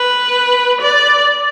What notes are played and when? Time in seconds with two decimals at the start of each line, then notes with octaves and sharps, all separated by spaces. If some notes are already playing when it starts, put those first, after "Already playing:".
Already playing: B4
0.81 D5